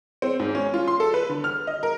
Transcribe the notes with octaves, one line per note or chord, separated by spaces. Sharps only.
C4
G#2
C#4
F4
C6
A4
B4
D3
F6
D#5
A#4